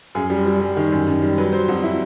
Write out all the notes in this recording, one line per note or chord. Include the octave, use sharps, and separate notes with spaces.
F#2 G#4
G3
G3
G3
D#3
F#2
F#2
G3
F#3 B4
F#3 C5
F2 F#4
E4